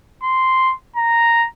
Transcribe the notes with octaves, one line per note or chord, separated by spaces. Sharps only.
C6
A#5